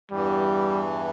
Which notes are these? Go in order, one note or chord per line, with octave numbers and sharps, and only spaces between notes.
E2 G2 E3 G3